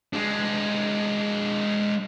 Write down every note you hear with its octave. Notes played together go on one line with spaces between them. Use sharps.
G#3 D4